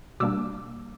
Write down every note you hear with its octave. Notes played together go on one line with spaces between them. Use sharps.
B2 G3 A#3 D4 D6 E6